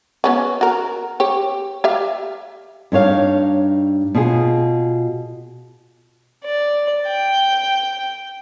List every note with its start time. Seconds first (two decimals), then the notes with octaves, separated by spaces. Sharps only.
0.24 B3 C#4 F#4
0.61 F#4 A#4
1.20 G4 C#5
1.84 G4 E5 F5
2.92 G2 D#4 C#5 F5
4.15 B2 F4 G#4
6.44 D5
7.07 G5